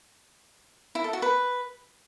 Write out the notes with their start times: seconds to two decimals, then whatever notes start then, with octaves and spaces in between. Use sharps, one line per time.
0.95 E4
1.04 A4
1.13 F#4
1.22 B4